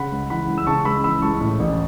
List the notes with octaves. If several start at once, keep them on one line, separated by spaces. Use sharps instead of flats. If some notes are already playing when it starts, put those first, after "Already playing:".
Already playing: C#3 F#5 B5
C#2
E3 F#5 B5
C#2
E6
C#3 A5 C#6
C#2 B5 E6
E3 B5 E6
C#2 A5 C#6
A2
A1